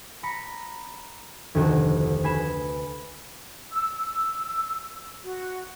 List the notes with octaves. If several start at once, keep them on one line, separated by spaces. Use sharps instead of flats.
A#5 B5 B6 C#7
F1 D2 D#3 F#4
B4 G#5 B5 C7 E7
E6
E6
F#4